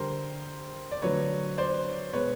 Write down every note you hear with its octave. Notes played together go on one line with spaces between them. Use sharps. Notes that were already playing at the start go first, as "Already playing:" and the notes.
Already playing: D3 G3 A#4 C5
D5
D3 F#3 A3 B4 C#5
C5 D5
B2 G#3 B4 C#5